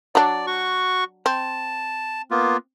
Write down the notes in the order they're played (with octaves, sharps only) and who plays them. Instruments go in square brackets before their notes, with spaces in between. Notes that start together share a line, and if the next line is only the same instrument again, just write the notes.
[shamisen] F#3 D4 [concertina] D5
[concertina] F#4 C#6
[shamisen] C4 [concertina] A5
[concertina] A#3 B3 F4